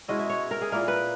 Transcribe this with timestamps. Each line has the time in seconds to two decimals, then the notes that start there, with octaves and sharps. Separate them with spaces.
0.08 B2 G#3 C#4 E4 D#5
0.19 E5
0.29 C#5
0.51 A#4
0.61 G#4
0.72 A#2 A#3 E4 A#4
0.88 B4